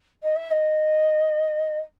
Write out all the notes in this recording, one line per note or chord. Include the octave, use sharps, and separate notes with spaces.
D#5
E5
D#5